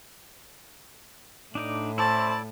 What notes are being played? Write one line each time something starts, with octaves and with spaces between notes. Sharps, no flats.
A2 D4 D#4 D5
C#4 E4 A4 C5 D5 A5 B5